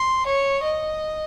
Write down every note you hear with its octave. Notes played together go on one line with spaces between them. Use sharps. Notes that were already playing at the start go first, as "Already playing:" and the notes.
Already playing: C6
C#5
D#5